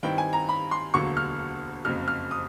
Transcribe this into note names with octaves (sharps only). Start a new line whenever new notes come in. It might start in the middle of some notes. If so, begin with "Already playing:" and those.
G2 D#3 G3 C4 E4 G5
G#5
A#5
B5
C6
E1 D2 D3 F#3 A#3 C#6
F6
F#1 F2 C#3 F#3 F6
F6
D#6